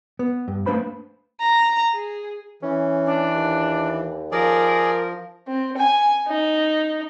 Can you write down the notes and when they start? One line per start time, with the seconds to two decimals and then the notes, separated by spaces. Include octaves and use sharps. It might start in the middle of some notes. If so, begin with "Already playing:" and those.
0.19 B3
0.48 G2
0.66 A3 A#3 D4 B4 C5 B5
1.40 A#5
1.93 G#4
2.63 E3 C#4
3.06 D4
3.35 D#2
4.32 F3 G#4 A#4 D5
5.47 C4
5.77 G#5
6.27 D#4